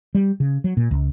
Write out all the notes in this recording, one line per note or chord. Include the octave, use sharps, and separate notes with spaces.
G3
C#3
F#3
A#2
C#2